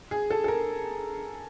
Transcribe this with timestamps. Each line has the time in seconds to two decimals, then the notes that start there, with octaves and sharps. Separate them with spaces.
0.11 G#4
0.30 A4
0.44 A4
0.48 A#4